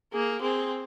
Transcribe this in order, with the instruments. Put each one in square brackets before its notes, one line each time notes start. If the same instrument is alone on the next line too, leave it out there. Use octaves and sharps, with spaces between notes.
[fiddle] A#3 [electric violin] G#4
[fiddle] C4 [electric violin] G#4